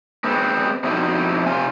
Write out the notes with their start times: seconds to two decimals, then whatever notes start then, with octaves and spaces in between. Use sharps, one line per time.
0.24 G#3 B3 C4
0.84 F2 B2 C4 D#4 E4
1.47 C3 C4 F4 G#5